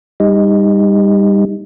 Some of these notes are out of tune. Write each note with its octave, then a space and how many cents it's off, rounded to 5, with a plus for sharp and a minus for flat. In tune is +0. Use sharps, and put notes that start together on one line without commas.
G3 +25 D#4 +0